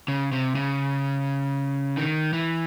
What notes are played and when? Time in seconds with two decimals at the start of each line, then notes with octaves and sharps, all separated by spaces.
0.08 C#3
0.32 C3
0.55 C#3
1.97 D#3
2.33 E3